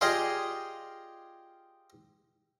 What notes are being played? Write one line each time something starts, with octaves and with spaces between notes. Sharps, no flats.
F4 G4 G#4 D5 D#5 F5